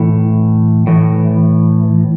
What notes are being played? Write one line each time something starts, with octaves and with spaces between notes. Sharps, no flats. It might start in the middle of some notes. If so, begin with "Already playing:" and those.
Already playing: A2 E3
A2 E3